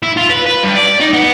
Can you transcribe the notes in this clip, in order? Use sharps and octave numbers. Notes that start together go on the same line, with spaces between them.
E4
F4
B4
B4
G2
D5
D#4
B3